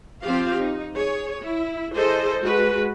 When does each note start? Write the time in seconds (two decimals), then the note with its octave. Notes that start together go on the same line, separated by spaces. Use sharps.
0.22 F3 C4 F4 G4 F5
0.57 D#4
0.94 G#4 C#5
1.42 E4
1.94 E3 G#4 A4 C5 D#5
2.40 G#3 F#4 B4